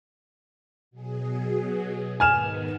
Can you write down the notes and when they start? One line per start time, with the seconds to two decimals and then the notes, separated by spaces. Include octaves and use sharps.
0.91 B2 F#3 G#4
2.20 G#2 D#3 B3 G#5 F6 E7